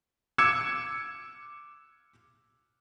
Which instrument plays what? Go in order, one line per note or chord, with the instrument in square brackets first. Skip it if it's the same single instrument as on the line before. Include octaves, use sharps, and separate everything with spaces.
[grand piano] D6 E6 G#6 C#7 E7